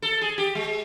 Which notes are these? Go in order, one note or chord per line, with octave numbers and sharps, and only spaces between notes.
A4
G#4
G4
G#3